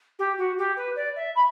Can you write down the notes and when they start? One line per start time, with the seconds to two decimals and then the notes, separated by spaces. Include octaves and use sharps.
0.18 G4
0.38 F#4
0.58 G4
0.76 B4
0.96 D5
1.16 E5
1.35 B5